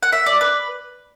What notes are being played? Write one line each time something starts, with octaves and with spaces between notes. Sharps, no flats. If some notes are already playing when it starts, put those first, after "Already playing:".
F#5
E5
D5
B4